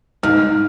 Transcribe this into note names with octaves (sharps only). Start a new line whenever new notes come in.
G#2 F6